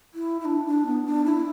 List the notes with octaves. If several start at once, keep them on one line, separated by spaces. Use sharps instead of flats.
E4
E4
D4
D4
B3
D4
E4